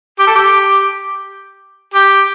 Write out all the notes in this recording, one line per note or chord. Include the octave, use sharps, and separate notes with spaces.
G4
A4
G4
G4